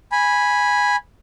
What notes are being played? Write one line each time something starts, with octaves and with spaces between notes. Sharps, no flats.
G#5 B5